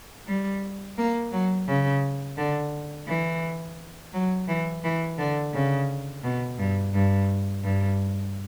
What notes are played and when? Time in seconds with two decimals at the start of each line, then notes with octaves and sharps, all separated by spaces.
0.27 G3
0.98 A#3
1.32 F#3
1.68 C#3
2.37 D3
3.07 E3
4.13 F#3
4.48 E3
4.84 E3
5.18 D3
5.54 C#3
6.23 B2
6.59 G2
6.94 G2
7.63 G2